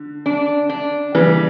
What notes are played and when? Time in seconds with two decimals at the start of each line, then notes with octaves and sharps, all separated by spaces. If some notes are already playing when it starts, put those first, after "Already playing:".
Already playing: D3
0.26 D4
0.69 D4
1.15 C#3 E3 G3